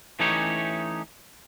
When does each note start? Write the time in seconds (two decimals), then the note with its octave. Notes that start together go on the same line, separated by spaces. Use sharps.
0.19 E3 A3 C#4 D#4 G4 C#5